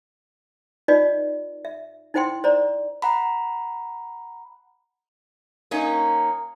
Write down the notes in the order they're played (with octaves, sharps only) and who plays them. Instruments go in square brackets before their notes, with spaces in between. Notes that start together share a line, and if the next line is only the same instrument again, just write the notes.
[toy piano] D#4 F4 B4 D5 D#5
E5
D#4 E4 C5 F#5 G5 C6
C5 D5 A#5
[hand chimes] F#5 A#5 B5
[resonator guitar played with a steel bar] A#3 C#4 D#4